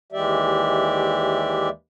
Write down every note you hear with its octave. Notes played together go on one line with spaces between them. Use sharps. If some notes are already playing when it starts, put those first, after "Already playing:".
D#2 E3 G#3 G4 D5 E5